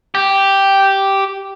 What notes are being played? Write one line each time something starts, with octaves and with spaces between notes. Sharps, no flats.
G4